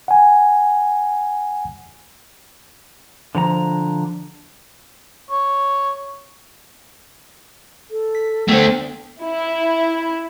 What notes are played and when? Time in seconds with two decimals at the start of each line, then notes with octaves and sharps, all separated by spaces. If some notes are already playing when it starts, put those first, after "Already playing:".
0.08 F#5 G#5
3.35 D3 F3 F#5 A#5
5.31 C#5
7.90 A4
8.15 B6
8.48 A3 B3 D4 A4 C5 G5
9.24 E4